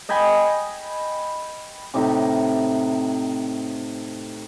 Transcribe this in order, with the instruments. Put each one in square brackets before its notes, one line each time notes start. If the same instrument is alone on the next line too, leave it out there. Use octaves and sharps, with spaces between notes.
[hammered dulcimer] D#5 G5 G#5 B5
A2 C3 D#4 D6